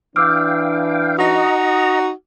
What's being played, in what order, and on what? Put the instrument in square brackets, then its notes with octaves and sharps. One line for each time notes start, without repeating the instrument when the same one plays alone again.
[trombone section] E3 D4 [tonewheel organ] F5 G5 [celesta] D6 E6 F6
[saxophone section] D#4 F#4 [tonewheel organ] D#5 A#5